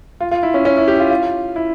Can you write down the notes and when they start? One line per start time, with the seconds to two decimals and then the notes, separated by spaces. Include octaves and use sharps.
0.21 F4
0.31 F4
0.43 E4
0.54 C#4
0.65 C#4
0.77 E4
0.88 G4
0.99 F4
1.11 F4
1.56 E4